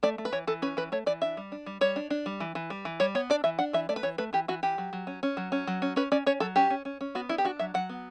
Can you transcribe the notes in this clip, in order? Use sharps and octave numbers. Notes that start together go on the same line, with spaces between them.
A3 D5
A3
B4
E3 C#5
E3 A4
C#4 B4
E3 B4
A3 C#5
E3 D5
D4 E5
G3
D4
G3
G3 C#5
D4
D4
G3
E3
E3
G3
E3
G3 C#5
B3 C#5
D4 D5
E3 E5
D4 F#5
E3 E5
A3 D5
B4
E3 C#5
A3 B4
E3 G4
E3 F#4
E3 G4
F#3
F#3
C#4
C#4
F#3
C#4
F#3
C#4
C#4 B4
C#4 D5
C#4 C#5
F#3 A4
C#4 G4
C#4
C#4
C#4
B3 F#4
D4 E4
G4
D4 F#4
F#3 E5
F#3 F#5
B3